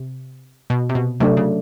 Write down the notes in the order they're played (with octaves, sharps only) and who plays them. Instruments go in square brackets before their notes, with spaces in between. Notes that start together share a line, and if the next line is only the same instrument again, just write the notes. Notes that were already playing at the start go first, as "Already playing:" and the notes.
Already playing: [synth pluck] C3
B2
C3
B2
[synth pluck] C3 [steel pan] F#3 A3 D4
[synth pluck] C#3